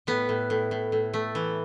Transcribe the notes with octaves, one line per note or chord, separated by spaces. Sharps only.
A2 B3
A2
A2
A2
A2
A3
E3